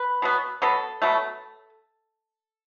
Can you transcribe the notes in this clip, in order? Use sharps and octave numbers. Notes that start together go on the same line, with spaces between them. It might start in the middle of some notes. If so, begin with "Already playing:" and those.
Already playing: B4
B2 F#3 B3
B2 F#3 B3 A4
B2 F#3 A3